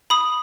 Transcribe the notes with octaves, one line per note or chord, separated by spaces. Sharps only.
B5 D#6